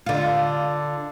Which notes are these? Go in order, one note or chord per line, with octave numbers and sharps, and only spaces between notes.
D3 F4